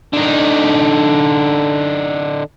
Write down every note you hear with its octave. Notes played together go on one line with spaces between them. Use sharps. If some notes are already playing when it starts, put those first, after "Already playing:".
D3 D#4